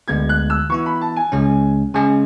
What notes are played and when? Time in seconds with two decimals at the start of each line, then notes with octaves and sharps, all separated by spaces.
0.08 D2 D3 G#3 B3 G#6
0.29 F#6
0.50 E6
0.70 E3 B3 E4 C#6
0.86 B5
1.01 A5
1.16 G#5
1.32 C#2 C#3 G#3 C#4
1.94 C#3 G#3 C#4 G#5